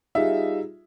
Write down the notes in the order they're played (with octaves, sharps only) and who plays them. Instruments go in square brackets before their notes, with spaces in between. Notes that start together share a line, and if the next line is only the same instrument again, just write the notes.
[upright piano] G3 D#4 F4 G#4 E5